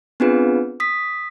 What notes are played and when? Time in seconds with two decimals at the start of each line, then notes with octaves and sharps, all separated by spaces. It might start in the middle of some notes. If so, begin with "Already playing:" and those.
0.20 B3 C4 D4 F4 G#4 B4
0.80 D#6 B6